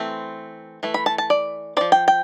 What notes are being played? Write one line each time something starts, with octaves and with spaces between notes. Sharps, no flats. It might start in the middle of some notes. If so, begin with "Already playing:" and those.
Already playing: E3 A3 C4
E3 A3
B5
A5
A5
D5
F3 C4 D5
G5
G5